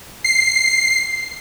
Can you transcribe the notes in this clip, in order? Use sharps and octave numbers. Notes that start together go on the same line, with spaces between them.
C7